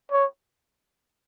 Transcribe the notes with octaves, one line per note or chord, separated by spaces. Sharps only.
C#5